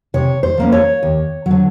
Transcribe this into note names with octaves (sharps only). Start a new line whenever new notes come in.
C3 C#5
C5
F3 A#3 C#4
C#5
D#2
D3 F#3